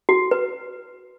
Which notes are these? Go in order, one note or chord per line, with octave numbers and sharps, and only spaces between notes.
F#4
B4